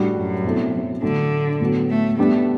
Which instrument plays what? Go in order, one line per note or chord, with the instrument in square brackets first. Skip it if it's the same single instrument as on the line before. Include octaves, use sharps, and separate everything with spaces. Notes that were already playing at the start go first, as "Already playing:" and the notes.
Already playing: [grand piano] A2 G3 D4 F#4
[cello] F#2
[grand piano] B2 A3 C4 E4 A4
[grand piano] A2 F#3 A3 D4 [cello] D3
[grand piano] A2 F#3 B3 F#4 A4
[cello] A3
[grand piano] G3 B3 D4 G4 [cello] A3